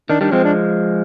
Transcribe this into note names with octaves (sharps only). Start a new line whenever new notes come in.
D#3 D4
D#3 G3 D4
F3 G#3 C4
D4